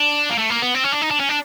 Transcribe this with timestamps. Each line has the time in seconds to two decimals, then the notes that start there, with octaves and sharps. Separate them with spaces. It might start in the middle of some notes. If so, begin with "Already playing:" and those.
Already playing: D4
0.30 A#3
0.38 A3
0.50 A#3
0.62 B3
0.74 C4
0.84 C#4
0.92 D4
1.02 D#4
1.11 D4
1.20 C#4
1.29 D4